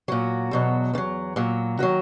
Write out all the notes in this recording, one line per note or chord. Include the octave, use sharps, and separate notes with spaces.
A#2 F#3 F#4
E2 B2 F#3
E2 D#3 F#3
A#2 F#3
D#3 F#3 F#4